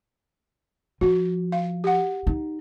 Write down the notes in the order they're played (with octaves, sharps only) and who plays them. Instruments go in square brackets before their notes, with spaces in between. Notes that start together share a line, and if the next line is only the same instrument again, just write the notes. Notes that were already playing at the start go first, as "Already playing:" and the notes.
[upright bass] F3 [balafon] F#4
[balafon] F5
G4 F#5
[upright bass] D#4